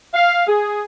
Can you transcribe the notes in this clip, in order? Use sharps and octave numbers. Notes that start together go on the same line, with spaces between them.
F5
G#4